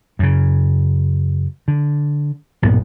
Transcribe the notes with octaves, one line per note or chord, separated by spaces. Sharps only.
F#2 C#3
D3
B1 G2 A#2 B3